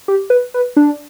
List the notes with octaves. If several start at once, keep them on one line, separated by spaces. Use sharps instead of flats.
G4
B4
B4
D4